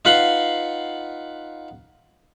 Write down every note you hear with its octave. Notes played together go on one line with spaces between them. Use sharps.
D#4 F4 B4 F#5 B5 C6